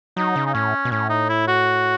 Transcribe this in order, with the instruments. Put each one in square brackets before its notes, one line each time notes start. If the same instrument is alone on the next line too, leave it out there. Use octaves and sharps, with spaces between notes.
[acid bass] F#3 [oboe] D#4
[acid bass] C#3
[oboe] D#4
[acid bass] A2 [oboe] C#4
[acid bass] B2
[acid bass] A2 [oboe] C#4
[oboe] D#4
E4
F#4